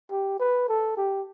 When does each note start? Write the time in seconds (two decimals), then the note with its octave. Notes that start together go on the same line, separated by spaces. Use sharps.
0.11 G4
0.40 B4
0.69 A4
0.97 G4